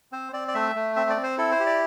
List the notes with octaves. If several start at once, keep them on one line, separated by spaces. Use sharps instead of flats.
C4 C5
C4 D5
D5
A3 E5
A3
C4 E5
D5
C4
C5
E4 A4
C5
G4
D5